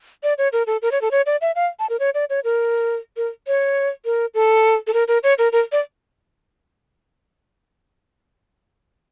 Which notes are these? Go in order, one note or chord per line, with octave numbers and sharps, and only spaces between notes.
D5
C#5
A#4
A4
A#4
C#5
A4
C#5
D5
E5
F5
A5
A#4
C#5
D5
C#5
A#4
A#4
C#5
A#4
A4
A4
A#4
A#4
C#5
A#4
A#4
D5